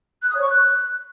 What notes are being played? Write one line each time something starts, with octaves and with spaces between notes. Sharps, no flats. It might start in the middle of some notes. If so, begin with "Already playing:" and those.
F#6
D#6
C#5
C#6
F#6